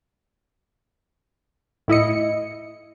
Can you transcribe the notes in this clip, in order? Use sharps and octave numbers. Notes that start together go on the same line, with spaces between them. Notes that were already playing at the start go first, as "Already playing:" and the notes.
A2 E4 D#5 C#7